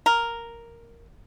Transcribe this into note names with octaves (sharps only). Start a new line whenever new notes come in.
A#4